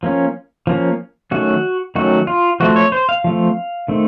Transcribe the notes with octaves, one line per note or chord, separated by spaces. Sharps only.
F3 A#3 C#4
F3 A#3 C#4
D#3 F#3 A3 C#4 F#4
D#3 F#3 A3 C#4 F#4
F4
F3 A3 C4 F#4
C#5
C5
F5
F3 A3 C4
D#3 A3 C4